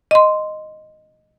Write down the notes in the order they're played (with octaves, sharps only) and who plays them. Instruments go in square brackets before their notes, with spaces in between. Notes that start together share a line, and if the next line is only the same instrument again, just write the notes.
[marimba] D#5 C6